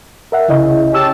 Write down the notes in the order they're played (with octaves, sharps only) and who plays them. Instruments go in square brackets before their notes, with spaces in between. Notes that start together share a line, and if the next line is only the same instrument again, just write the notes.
[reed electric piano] A#4 E5 F#5
[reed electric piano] C2 E4 D#5 [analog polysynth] C#3
[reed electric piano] D2 E6 [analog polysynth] C#4 G4 A5